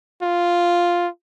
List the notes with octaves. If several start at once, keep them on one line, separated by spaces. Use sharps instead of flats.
F4